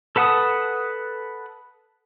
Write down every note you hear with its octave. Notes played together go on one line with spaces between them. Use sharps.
A4 B4 F#5 A5 D#6